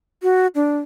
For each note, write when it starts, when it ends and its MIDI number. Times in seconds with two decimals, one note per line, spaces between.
0.23 0.47 66
0.55 0.78 62